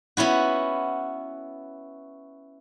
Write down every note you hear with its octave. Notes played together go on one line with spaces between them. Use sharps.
B3 C#4 E4 F#4